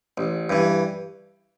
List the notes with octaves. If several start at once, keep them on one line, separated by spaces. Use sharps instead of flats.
A1
G2 E3